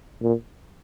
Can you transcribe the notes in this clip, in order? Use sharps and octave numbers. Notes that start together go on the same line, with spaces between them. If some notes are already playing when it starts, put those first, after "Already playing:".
A#2